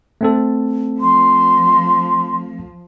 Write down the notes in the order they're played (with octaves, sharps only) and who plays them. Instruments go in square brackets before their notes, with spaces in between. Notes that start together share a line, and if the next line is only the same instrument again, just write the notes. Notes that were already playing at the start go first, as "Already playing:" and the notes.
[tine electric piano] A3 C4 A4
[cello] F3 [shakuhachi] C6